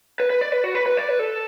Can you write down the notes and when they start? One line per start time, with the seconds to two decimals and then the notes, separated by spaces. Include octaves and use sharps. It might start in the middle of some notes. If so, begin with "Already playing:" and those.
0.20 B4
0.30 B4
0.41 D5
0.52 B4
0.64 F#4
0.75 B4
0.86 B4
0.97 D5
1.09 B4
1.19 A4